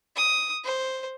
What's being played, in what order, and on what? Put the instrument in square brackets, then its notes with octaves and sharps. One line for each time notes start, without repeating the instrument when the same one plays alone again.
[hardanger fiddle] D#6
C5